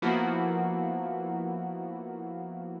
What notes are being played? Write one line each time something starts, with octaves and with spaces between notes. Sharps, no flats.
F3 A#3 B3 E4 F#4